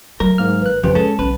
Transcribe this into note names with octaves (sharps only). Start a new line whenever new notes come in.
F#3 A3 A#4
G#2 A#3 F6
G#1 B4 F#6
F2 C#3 F3 G4 B4
G#3 C#4 G#4 A4 A5
B1 C#4 B4